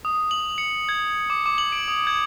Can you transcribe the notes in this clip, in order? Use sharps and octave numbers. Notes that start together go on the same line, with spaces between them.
D#6
F#7
C#7
G#6
D6
D6
F#7
D7
D#6
G#6